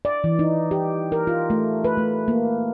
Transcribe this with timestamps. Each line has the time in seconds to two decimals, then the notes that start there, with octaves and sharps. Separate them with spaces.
0.05 D5
0.24 E3
0.39 D#4
0.71 G4
1.12 A#4
1.27 F4
1.50 A3
1.84 B4
1.97 A3
2.28 A#3